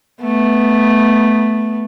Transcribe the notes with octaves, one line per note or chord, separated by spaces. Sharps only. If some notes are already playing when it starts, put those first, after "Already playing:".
A3 B3